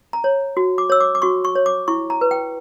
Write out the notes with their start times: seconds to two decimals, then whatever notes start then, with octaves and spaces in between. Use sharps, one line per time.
0.13 A#5
0.24 C#5
0.57 F#4
0.78 D6
0.89 C#5 E6
1.01 D6
1.15 D6
1.22 F#4 C#6
1.45 C#6
1.55 C#5
1.66 D6
1.88 E4 C#6
2.10 A#5
2.21 B4
2.31 G5